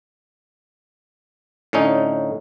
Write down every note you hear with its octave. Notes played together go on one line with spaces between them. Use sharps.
A2 D3 C#4 D#4